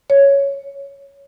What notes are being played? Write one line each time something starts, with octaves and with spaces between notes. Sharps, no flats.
C#5